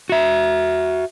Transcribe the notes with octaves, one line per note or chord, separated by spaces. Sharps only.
F#4 E5